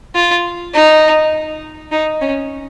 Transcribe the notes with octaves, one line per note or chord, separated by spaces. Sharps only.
F4
D#4
D#4
C#4